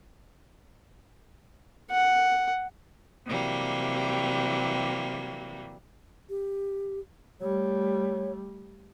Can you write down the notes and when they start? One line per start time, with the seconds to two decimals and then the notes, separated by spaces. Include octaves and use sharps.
1.91 F#5
3.26 C3 E3 F#3 G3 A#3
6.29 G4
7.40 G3 A3 C#5